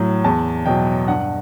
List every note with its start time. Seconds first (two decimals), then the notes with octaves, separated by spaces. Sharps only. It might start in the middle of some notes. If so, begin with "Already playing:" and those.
Already playing: A2 F#3
0.24 E2 A5
0.66 B2 F#3 G5
1.08 G2 F#5